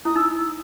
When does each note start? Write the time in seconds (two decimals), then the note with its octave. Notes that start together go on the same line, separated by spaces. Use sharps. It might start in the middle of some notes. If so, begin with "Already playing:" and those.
0.05 E4 D#6
0.16 D#4 E6